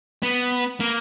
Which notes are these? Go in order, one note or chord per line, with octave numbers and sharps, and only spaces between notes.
B3
A#3